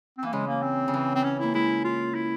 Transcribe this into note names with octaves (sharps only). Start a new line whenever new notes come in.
C4
E3 A#3
C#3 G#3
A#3
C4
C#3
E3
C4
C#4
A#3 E4
G#3 E4
F4
E4